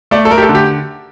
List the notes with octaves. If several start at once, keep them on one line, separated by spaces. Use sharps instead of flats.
A3 D5
A4
A3 A#4
G4
A4
D3
G4